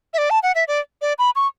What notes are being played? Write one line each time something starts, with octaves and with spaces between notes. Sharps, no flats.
E5
D5
A5
F#5
E5
D5
D5
B5
C#6